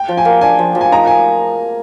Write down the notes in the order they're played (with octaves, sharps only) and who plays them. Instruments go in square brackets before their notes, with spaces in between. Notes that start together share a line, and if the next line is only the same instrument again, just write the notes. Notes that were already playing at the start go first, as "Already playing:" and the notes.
Already playing: [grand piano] G5
[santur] F3
[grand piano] G#5
[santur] A#3
[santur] D4 [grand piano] G#5
[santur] F3
F3
[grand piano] G#5
[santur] D#4 [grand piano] A#5
[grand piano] G#5